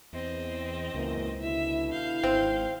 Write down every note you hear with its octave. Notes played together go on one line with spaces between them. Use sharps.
E2 C4 D#5
C#2 F#2 E3 A#3
B2 D3 E4 E5
F5 G6
G#1 C4